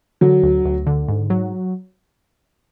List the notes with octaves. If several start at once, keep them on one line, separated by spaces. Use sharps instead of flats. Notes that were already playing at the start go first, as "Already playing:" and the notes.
D3 F#3
D2
D2
D3
G#2
F#3